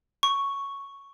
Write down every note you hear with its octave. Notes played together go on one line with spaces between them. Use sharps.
C#6